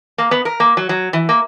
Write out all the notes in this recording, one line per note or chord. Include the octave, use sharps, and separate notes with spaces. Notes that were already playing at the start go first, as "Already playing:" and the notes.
A#3
B3
A#4
A#3
F#3
F#3
E3
A#3